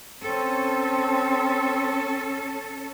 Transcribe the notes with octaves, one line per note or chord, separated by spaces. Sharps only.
C4 C#4 A4